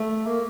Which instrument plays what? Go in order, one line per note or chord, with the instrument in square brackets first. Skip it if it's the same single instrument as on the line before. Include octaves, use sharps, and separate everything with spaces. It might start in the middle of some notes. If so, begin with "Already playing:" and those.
Already playing: [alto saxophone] A3
A#3